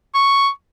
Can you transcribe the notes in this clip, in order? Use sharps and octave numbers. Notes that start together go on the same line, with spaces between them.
C#6